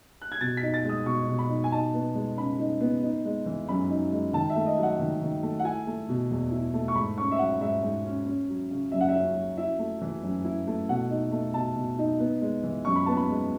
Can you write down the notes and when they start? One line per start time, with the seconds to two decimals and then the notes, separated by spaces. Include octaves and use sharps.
0.22 F#6
0.32 G#6
0.41 B2 A6
0.57 B6
0.63 D#4
0.74 A6
0.85 G#3 D#6
1.06 B2 C#6
1.28 B2
1.39 B5
1.50 D#4
1.64 G#5
1.72 D#4 A5
1.94 B3
2.15 G#3
2.37 C#3 B5
2.59 D#4
2.81 B3
3.03 D#4
3.25 G#3
3.46 E3
3.69 F#2 B5
3.90 D#4
4.12 G#3
4.33 D#3 A5
4.50 E5
4.56 A3
4.66 D#5
4.78 F#3 F#5
4.99 D#3
5.22 D#3
5.43 A3
5.60 F#5
5.64 E4 G#5
5.87 A3
6.09 B2
6.31 E2
6.52 E4
6.74 A3
6.88 C#6
6.95 G#2 B5
7.18 C#4 C#6
7.32 E5
7.39 F#3 F#5
7.61 G#2 E5
7.83 G#2
8.05 C#4
8.26 C#4
8.49 F#3
8.70 C#3
8.92 F#2 E5
9.01 F#5
9.09 E5
9.14 C#4
9.35 F#3
9.57 E4 E5
9.79 A3
10.01 E3
10.23 F#2
10.45 E4
10.67 A3
10.89 B2 F#5
11.10 D#4
11.32 A3
11.54 B2 A5
11.75 B2
11.98 D#4
12.20 B3
12.42 G#3
12.63 E3
12.85 F#2 C#6
12.96 B5
13.06 B3 A5
13.17 B5
13.29 G#3